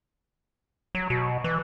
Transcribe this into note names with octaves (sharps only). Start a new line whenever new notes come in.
F#3
B2
E3